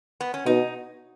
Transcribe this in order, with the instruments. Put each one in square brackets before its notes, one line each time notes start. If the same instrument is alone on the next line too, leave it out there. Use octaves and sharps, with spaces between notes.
[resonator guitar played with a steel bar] B3
C#4
[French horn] B2 [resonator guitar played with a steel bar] D#4